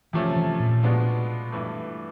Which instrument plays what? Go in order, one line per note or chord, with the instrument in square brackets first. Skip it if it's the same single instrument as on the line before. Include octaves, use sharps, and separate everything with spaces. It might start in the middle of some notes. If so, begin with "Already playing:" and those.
[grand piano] C3 F3 A3 C#4 [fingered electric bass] E3
[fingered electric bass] E3
A#2
[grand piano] B2 G#3 B3 D4 F4
G2 E3 A3